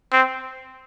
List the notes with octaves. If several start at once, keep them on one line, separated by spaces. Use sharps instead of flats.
C4